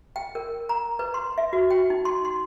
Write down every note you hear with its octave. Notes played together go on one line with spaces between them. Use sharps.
G5
A#4
A#5
B4
C6
E5
F#4
G5
D#4
C6
C6